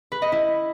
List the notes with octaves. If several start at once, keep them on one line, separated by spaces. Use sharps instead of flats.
B4
D#5
E4